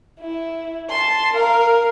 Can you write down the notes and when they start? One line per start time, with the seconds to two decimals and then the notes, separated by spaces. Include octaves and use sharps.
0.21 E4
0.90 A5 C6
1.34 A#4 F5